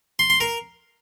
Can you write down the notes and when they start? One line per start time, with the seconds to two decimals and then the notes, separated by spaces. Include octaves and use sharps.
0.19 C6
0.30 C6
0.40 A#4